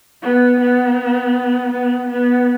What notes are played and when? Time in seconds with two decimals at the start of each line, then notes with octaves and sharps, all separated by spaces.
0.22 B3
0.60 B3
1.72 B3
2.10 B3